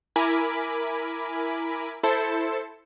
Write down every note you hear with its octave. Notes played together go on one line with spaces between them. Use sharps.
E4 A#4 G#5 B5 D6 B6
E4 A4 C5 A5 C#7